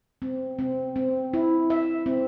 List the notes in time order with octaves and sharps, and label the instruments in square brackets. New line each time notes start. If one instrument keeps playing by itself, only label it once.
[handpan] C4
C4
C4
E4
E5
C4